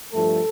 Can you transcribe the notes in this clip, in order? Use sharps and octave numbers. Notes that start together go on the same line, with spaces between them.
G2 F3 A3 A4